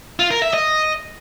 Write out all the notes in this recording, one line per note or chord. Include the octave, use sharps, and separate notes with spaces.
F4
A#4
E5
D#5